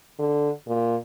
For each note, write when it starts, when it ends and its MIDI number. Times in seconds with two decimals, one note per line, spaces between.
0.19 0.50 50
0.68 0.96 46